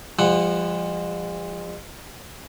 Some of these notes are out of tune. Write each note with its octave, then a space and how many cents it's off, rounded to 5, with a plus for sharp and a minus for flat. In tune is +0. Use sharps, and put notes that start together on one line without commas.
F3 +0 G#3 -45 F#5 +0